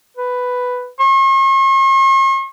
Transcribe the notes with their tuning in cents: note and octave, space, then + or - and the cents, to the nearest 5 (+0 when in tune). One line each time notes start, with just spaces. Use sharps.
B4 +5
C#6 -45